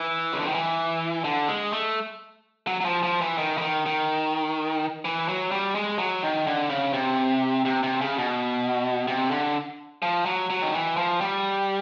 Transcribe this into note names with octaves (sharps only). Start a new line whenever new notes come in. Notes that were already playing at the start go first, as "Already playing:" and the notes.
Already playing: E3
C#3
D3
D#3
E3
D3
G#3
A3
F#3
F#3
F3
F3
E3
D#3
E3
D#3
D#3
E3
F#3
G3
G#3
F#3
D#3
D3
C#3
C3
C3
C3
C#3
B2
C3
D3
F3
F#3
F#3
D#3
E3
F3
G3